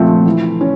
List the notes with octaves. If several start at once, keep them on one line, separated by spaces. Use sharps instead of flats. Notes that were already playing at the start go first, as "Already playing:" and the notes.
Already playing: A#2 F3 A3 C4
E3
C#4